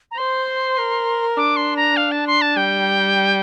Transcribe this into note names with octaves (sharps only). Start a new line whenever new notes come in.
A#5
C5 C6
A#4
D4 D6
C6
A#5
F5
A5
C6
A5
G3 G5